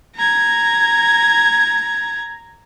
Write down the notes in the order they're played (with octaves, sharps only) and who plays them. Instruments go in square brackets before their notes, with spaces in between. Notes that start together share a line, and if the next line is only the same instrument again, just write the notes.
[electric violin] A#5 G#6